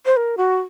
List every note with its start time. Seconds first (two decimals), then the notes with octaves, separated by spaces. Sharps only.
0.06 C5
0.17 A#4
0.37 F#4